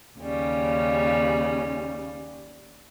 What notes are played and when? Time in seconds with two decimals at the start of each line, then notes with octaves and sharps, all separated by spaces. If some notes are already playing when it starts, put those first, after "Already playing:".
0.19 D#2 C#3 G3 C#4